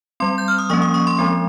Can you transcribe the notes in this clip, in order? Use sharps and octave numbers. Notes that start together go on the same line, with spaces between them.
G3 C4 C6
G6
F6
D#6
F3 A#3 C#4 C#6
D#6
C#6
C6
F3 G#3 C4